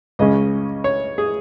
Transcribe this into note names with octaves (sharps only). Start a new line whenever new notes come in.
C#2 C#3 G#3 C#4 D#5
C#5
G#4